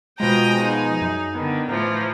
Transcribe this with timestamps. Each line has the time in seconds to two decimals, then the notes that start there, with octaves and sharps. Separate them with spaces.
0.20 B2 F3 G#3 G5 A#5 D#6
0.61 D#4 G#4
1.01 F#2
1.35 D3 D#3 B3
1.69 A2 E3 F3 A#5